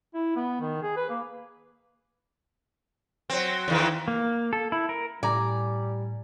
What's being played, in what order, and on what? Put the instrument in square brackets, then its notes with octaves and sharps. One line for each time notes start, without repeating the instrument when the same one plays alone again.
[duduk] E4
B3
D#3
G#4
B4
A#3
[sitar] F#3 C4
E2 D#3 E3
[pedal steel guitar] A#3
A4
E4
A#4
[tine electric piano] A2 [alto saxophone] G3 [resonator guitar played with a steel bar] D5 [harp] G#5 A#5